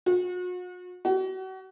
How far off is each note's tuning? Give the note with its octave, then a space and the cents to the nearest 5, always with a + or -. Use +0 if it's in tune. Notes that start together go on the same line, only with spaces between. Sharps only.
F#4 -40
F#4 +35